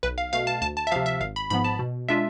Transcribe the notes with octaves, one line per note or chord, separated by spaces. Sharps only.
B1 B4
F5
B2 A3 F5
A5
D2 A5
A5
E5
C3 F3 F5
E5
G#1 F5
B5
G#2 F3 B3 B5
A5
B2
G#3 D4 F4 E5